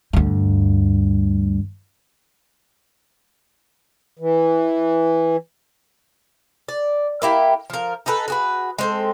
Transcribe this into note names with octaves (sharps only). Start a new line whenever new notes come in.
D2 G2
E3
D5
A#3 E4 G4
F3 A#4
D#4 G#4 A4 B4
F#4 G#4 B4
G#3 C4 A4